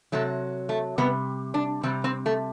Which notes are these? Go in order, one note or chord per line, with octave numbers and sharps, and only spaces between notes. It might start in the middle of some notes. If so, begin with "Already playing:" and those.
C3 F#3 A3
A3
C3 G3 B3
D4
C3 G3 C4
C4
A3